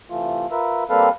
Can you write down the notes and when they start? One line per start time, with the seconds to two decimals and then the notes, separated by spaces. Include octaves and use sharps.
0.10 C3 E3 A3 F4
0.51 F4 A#4 B4 E5
0.89 G3 A#3 C4 A4 B4 F5